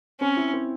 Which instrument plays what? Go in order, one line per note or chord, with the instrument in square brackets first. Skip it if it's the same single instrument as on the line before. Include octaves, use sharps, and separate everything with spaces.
[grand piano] C4 [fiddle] C#4
[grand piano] E4
C4